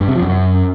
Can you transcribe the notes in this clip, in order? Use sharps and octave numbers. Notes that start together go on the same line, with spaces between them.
G2
C3
F3
F#2